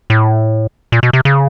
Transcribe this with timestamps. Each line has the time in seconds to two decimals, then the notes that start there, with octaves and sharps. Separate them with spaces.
0.10 A2
0.92 A#2
1.03 B2
1.13 C3
1.25 C#3